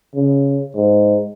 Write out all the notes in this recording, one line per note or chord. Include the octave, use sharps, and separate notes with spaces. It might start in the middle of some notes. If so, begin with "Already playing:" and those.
C#3
G#2